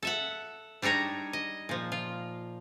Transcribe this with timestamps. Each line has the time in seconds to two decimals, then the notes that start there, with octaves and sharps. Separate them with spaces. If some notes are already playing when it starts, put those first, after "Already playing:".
0.03 A4 E5 F#5
0.82 G3 D4 D#4 C#5 A#5
1.33 D#5
1.69 A#2 F3
1.92 F4